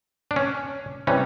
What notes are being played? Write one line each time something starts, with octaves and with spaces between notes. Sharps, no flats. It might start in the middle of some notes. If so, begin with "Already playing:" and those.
D4
C#4
C3 E3 G3 C#4